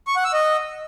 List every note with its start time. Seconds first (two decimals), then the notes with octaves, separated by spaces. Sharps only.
0.07 C#6
0.16 F#5
0.25 E6
0.33 D#5